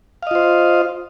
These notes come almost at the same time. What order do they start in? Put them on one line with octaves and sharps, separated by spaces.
F5 D#5 F4 C5